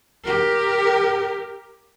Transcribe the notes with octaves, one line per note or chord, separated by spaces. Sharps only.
G4 A#4